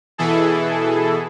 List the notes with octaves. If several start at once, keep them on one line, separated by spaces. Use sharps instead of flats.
B2 E3 E4 G#4 A4